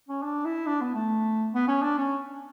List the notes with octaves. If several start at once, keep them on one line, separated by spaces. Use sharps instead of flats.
C#4
D4
E4
D4
B3
A3
B3
C#4
D4
C#4